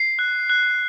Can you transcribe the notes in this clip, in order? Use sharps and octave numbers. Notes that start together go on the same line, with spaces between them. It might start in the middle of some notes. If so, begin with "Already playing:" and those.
Already playing: C7
F#6
F#6